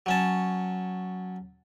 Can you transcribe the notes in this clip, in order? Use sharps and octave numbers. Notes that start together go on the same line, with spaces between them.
F#3 C#4 A5